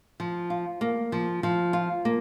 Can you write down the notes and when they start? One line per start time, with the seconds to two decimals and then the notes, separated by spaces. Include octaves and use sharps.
0.20 F3
0.50 F4
0.81 A#3
1.12 F3
1.43 F3
1.73 F4
2.05 A#3